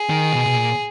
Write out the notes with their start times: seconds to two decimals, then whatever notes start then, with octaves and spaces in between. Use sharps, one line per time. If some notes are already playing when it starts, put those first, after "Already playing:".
Already playing: G#4
0.10 D#3
0.32 B2
0.46 B2
0.56 A#2